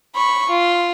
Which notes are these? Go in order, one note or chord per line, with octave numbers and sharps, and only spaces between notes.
B5 C#6
F4